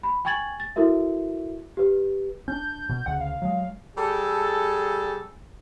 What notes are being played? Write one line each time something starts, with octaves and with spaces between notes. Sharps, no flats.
B5
G5 G#5 C#6 G#6 A6 F#7
A6
E4 F#4 A4 A#4 E5
G4 B4
C#4 D4 G6
B2
D2 C#3 F#5
F5
F#3 G#3
G3 G#4 A4